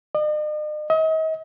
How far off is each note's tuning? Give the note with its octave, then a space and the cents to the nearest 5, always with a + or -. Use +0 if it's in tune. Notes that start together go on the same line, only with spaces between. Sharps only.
D#5 -45
D#5 +40